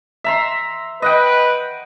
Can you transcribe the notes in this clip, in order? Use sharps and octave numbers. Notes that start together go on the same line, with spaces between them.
E5 A#5 C6
B4 D#5 F#5 G5